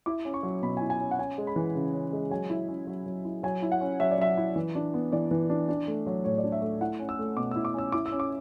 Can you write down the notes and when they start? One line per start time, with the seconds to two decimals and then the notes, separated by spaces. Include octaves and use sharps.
0.06 E4 D6
0.25 C#4
0.34 C#6
0.43 F#3
0.62 B2 B5
0.77 G#5
0.81 E4
0.90 G#5
1.00 C#4
1.11 F#5
1.18 C#4 G#5
1.38 G#3
1.47 B5
1.56 E3
1.75 C#3
1.94 C#4
2.13 G#3
2.31 F#3 G#5
2.50 E4
2.68 C#4
2.87 F#3
3.06 F#3
3.25 E4
3.43 F#3 G#5
3.62 E4
3.72 F#5
3.81 C#4
4.00 F#3 E5
4.11 D5
4.18 F#3 E5
4.37 E4
4.56 E3
4.75 D4
4.94 B3
5.12 E3 D5
5.31 E3
5.50 D4
5.69 D4
5.87 A3
6.07 F#3
6.24 A2 C#5
6.38 D5
6.44 D4
6.52 E5
6.62 A3
6.81 E4 F#5
6.99 C#4
7.09 E6
7.19 A3
7.37 B2 D6
7.51 E4 E6
7.65 D6
7.74 C#4 E6
7.92 E4 D6
8.06 E6
8.12 C#4
8.20 D6